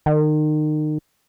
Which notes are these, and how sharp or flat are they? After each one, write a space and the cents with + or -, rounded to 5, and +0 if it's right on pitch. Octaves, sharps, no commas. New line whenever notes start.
D#3 -30